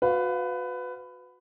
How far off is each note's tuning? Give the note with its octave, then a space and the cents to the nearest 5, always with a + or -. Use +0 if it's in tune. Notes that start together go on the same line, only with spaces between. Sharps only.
F#4 -25 B4 +20 F5 +0